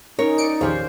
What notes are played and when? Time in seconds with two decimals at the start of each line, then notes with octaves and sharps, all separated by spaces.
0.19 C#4 D#4 A#4 C#5
0.38 D5 C#7 D7
0.61 A#1 E2 D#3 G4 G#4 C5 C#5 F5